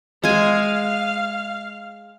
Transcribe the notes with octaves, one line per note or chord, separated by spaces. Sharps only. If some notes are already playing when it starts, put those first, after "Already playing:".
G#3 F5 G#5